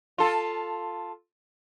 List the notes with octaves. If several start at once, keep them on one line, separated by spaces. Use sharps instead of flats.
F4 A4